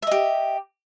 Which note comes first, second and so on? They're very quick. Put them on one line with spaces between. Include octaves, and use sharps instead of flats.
E5 D#5 G4